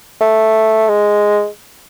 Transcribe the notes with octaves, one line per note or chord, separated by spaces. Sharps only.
A3
G#3